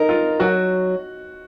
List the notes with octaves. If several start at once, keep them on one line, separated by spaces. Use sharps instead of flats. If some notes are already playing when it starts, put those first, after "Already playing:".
Already playing: D#4 A#4
F4
F#3 F#4